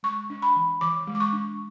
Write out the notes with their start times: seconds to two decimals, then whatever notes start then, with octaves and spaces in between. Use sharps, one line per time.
0.03 G#3 C#6
0.30 D4
0.42 B5
0.56 E3
0.81 E3 D6
1.07 G#3
1.15 D6
1.20 C#6
1.33 D4